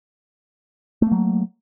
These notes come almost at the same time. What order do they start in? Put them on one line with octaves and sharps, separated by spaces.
A3 A#3 F#3